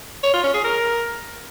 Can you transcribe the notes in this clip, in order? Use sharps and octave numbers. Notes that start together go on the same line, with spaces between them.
C#5
F4
C#4
G#4
A#4